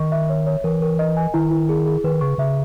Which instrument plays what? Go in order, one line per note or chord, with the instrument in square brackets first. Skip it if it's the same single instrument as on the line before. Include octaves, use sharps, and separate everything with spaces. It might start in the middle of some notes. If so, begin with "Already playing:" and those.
Already playing: [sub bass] D#3 [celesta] D#5 C#6
[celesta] E5
C#5
C#5
[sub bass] E3 [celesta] A#4
[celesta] A#4
D#5
G#5
[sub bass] D#3 [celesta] E4
[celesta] E4
G#4
G#4
[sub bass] D#3 [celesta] B4
[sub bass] C#3 [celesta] C#6
[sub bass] C#3 [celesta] E5